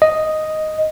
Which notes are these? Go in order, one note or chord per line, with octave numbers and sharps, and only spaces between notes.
D#5